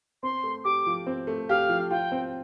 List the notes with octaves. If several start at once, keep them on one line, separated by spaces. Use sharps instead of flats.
C4 C6
A3
G4 D6
F3
C4
A3
G4 F5
F3
F4 G5
C4